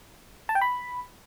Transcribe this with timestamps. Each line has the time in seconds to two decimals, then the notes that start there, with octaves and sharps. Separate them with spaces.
0.49 A5
0.55 G5
0.61 B5